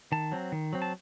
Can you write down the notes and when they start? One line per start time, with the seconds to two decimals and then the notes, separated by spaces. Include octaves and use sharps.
0.12 D#3 A5
0.32 F#3 C4
0.52 D#3
0.73 F#3 C4
0.82 A5